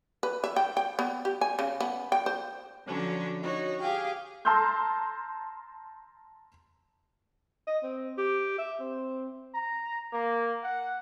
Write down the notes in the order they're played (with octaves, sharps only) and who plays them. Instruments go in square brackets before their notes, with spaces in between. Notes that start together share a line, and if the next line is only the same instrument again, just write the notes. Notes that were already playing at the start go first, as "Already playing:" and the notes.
[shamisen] B4
E5
G5
G5
B3
G4
G#5
C#3
B3
G5
C5
[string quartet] D3 F3 F#3 C#4 D4
D#4 F#4 C#5
G4 G#4 F5 G5
[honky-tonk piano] A5 A#5 C6 E6 F6 G6
[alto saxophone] D#5
C4
G4
E5
C4
[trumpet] A#5
A#3
F#5